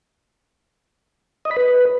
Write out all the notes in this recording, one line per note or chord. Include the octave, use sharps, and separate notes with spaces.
D#5
B5
B4